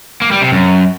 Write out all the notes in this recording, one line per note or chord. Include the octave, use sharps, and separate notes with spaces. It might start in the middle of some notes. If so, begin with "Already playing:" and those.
A#3
G3
C3
F#2